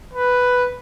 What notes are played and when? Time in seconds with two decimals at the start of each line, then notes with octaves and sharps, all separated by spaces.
0.14 B4